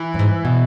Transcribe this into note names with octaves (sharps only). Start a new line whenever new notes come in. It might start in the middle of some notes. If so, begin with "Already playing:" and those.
Already playing: E3
F#2
G#2
B2